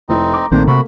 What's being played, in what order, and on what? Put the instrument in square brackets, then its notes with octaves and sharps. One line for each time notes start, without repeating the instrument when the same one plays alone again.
[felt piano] F1 E4 A4 [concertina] C4 D#4
[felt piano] A#5 D6
[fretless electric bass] A#1 D#3 C4 [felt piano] A3 A#3 A#4 [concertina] D4 C5
[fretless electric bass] C3 [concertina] F#4 B5